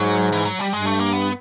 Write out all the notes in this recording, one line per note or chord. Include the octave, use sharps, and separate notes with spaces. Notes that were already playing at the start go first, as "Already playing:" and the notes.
Already playing: G#2 F#3
E3
F#3
G3
G2 G#3
A3
A#3
B3